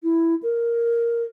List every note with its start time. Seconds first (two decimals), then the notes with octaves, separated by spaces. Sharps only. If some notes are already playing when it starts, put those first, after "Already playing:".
0.03 E4
0.43 A#4